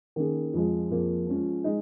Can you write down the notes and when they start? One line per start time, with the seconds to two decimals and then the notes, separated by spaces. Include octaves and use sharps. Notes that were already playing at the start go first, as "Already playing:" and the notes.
0.16 D#3 A#3 C#4 G#4
0.53 F2 F3 G#3
0.90 F2 F3 A#3 F4 G#4
1.27 F3 G#3 C#4 F4
1.64 G#3 D#4